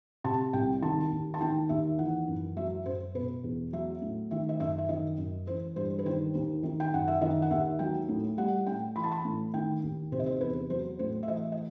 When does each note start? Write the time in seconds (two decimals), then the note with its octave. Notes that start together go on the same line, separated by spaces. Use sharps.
0.24 C3 A5
0.53 C2 G5
0.82 D#3 A5
1.12 D#2
1.34 A5
1.41 D#3 G5
1.69 D#2 E5
1.99 E3 F#5
2.27 F#2
2.57 F#3 E5
2.86 F#2 C5
3.15 B2 B4
3.44 E2
3.73 F#3 E5
4.02 A2
4.31 D#3 E5
4.49 D#5
4.60 F#2 E5
4.78 E5
4.89 D#3 D#5
5.18 F#2
5.47 E3 C5
5.76 G2 C5
5.99 B4
6.06 D#3 C5
6.35 D#2
6.63 D#3
6.80 G5
6.93 F#2 F#5
7.08 E5
7.21 D#3 D#5
7.42 F#5
7.51 D#2 E5
7.79 F#3 G5
8.09 A2
8.37 G3 F#5
8.67 A2 G5
8.96 E3 B5
9.04 A5
9.11 B5
9.25 A2
9.54 D#3 G5
9.83 D#2
10.12 C3 C5
10.19 D#5
10.26 C5
10.41 E2 B4
10.70 F#3 C5
10.99 A2 C5
11.23 E5
11.28 E3 D#5
11.52 D#5